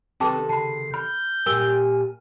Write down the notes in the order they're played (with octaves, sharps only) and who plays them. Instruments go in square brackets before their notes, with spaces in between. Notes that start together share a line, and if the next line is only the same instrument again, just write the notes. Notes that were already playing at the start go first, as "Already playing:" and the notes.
[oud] C3 D#3 A4 [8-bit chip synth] C4 B4 [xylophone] G5 A5 D6
[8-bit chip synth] C#3 C7 [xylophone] A5 B5
[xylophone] B5 [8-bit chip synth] F6 [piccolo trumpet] G6
[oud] A#2 G4 [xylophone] A#4 E6 G7 [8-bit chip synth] G#5 F6